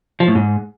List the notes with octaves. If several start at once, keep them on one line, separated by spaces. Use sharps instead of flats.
F3
A2
G#2